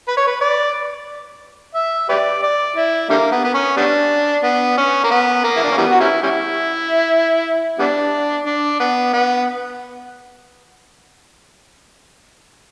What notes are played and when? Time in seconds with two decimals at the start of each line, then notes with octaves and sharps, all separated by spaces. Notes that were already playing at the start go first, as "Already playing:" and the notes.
0.08 B4
0.17 C#5
0.27 B4
0.41 D5
1.75 E5
2.09 G4 B4 D5
2.43 D5
2.76 E4
3.10 D3 G3 A#3
3.32 B3
3.44 B3
3.54 C#4
3.77 G3 B3 D4
4.43 B3
4.78 C#4
5.04 A#3
5.11 B3
5.44 A#3
5.57 E4
5.64 D4
5.71 C#4
5.78 E3 G3 B3
5.91 F#4
6.00 G3 C#4 E4
6.23 G3 C#4 E4
7.79 G3 B3 D4
8.46 D4
8.80 B3
9.13 B3